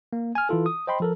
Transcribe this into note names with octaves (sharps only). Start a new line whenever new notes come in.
A#3
G#5 F6
E3 E4 F4 A4
D#6
C5 D#5 G5 B5 C6
F3 A4 A#4